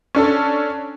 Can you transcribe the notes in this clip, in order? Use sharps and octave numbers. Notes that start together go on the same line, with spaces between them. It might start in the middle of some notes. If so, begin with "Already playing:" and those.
C#4 D4 A4